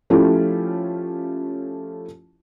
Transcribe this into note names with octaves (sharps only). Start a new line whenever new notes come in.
F3 A3 C#4 E4 F4 G4